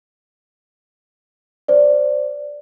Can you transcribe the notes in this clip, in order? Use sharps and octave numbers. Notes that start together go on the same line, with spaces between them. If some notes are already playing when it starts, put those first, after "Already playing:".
C5 D5